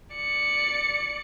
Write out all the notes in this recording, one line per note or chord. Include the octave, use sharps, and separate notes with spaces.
D5 C#7